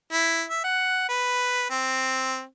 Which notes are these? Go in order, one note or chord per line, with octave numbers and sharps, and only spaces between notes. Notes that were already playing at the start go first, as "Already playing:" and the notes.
E4
E5
F#5
B4
C4